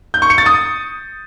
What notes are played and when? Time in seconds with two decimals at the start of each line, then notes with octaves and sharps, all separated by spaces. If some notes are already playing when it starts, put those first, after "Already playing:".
0.14 G6
0.22 C#6
0.30 C#7
0.38 A6
0.46 D#6